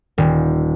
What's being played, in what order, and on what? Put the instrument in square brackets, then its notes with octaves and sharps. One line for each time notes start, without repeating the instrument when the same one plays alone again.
[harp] D#1